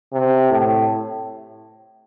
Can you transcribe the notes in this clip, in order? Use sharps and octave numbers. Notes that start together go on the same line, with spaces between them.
C3
A2